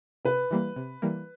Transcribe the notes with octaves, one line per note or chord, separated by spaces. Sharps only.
C3 B4
E3 G3 A#3
C3
E3 G3 A#3